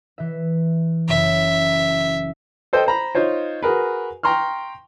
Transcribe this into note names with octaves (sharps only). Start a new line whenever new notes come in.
E3 E5
F#1 C#3 E5
A4 C5 D#5 G5
C5 A#5 B5
D#4 F4 C5 C#5
F#4 G#4 A#4 B4
G5 A#5 C6 C#6 F6